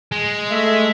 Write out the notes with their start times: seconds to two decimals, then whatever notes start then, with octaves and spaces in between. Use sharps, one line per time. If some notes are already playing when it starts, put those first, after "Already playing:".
0.12 G#3
0.51 A3 E5